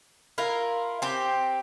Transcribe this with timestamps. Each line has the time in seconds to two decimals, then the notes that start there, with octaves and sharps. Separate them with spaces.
0.38 E4 F4 A#4
1.02 C4 G4